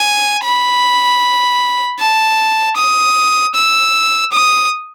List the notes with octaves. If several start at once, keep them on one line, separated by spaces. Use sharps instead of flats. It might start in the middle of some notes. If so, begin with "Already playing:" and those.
Already playing: G#5
B5
A5
D#6
E6
D#6